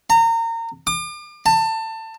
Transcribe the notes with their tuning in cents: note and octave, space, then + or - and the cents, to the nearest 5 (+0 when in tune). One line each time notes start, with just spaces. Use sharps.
A#5 -30
D6 +40
A5 +25